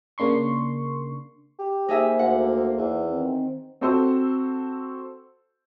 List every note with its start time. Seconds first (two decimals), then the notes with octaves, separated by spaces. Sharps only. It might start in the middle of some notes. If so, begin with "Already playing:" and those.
0.18 C#3 A#3 D4 C6 C#6
1.59 G4
1.88 A#3 D#4 G#4 C5 E5
2.19 D2 F#5
2.77 E2
3.10 D#3 C4
3.81 C4 F#4 A4 C5